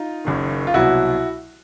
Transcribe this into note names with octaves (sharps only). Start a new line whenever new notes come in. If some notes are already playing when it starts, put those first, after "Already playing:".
Already playing: D#4 F4
F#1 F#2 D#3
F4
C2 B2 F#3 E4 F#4